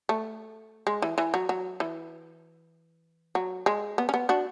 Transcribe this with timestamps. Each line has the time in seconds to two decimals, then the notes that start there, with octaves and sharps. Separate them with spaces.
0.09 A3
0.87 G#3
1.02 E3
1.18 E3
1.34 F#3
1.49 F#3
1.80 E3
3.35 F#3
3.66 G#3
3.98 B3
4.09 C#4
4.14 B3
4.29 D4 F#4